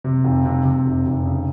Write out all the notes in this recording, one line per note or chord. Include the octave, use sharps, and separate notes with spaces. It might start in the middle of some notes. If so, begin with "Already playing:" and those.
C3
F1
C3
C3
F1
F1
C#3